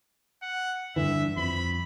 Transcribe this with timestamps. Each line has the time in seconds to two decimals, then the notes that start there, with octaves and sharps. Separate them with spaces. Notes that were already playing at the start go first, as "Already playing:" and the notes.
0.43 F#5
0.96 G2 D3 E3 E5
1.37 F2 B5